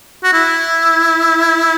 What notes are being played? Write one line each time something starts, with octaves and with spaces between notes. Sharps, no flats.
F#4
E4